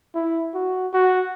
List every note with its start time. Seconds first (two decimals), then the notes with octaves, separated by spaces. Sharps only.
0.14 E4
0.54 F#4
0.93 F#4